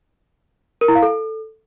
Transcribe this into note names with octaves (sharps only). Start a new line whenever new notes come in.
A#4
E4
F5
A4